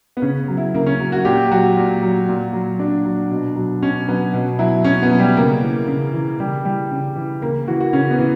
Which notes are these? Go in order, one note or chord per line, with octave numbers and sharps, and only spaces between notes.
B3
C#3 C#4
F#3
E4
C#3 A#3
C#4
F#3
F#4
A#2 G4
F#3 F#4
A#2
F#3
A#2
F#3
A#2 D4
F#3
B2
F#3
B2 C#4
F#3 B3
B2
F#3 E4
B2 C#4
B3
F#3
G3
C#3 A#3
E3
C#3
E3
C#3 G3
E3 G3
C#3
E3
C#3 A#3
E3 F#4
F#4
C#3 C#4
B3
E3